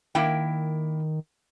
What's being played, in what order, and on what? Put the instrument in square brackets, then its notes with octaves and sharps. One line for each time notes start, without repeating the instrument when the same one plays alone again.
[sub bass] D#3 [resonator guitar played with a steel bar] A#3 E4 G5